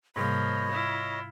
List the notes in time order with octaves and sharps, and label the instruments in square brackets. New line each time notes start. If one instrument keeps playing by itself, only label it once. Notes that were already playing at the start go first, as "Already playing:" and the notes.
[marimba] G#2 C3 G3 [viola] F3 A#3 [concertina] C#5 D#5 [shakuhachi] B5
[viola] E4 F4